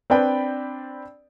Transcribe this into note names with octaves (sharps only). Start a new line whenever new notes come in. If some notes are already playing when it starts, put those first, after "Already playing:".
C4 D4 B4 D5 G5 B5